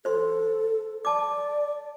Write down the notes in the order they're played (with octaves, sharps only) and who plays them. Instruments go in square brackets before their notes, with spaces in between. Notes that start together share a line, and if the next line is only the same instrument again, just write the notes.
[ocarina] A4 [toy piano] C5 C6
[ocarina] D5 [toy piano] A5 D6